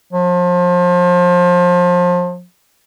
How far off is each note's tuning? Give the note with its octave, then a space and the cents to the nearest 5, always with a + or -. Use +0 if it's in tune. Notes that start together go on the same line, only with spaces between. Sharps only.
F3 +30